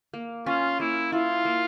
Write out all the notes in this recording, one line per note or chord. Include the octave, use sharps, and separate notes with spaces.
A#3
C#4 F4
A#3 E4
E4 F4
A#3